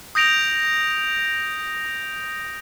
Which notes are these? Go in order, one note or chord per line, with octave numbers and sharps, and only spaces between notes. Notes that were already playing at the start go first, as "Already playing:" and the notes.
D#6 G6 A#6 D7 F7